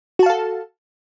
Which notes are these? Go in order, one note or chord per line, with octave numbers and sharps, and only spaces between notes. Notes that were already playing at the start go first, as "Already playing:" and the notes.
F#4 A4 F5 A5